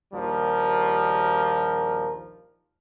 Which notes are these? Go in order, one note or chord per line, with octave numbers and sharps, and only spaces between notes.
A#1 D#2 F3 G3 A#4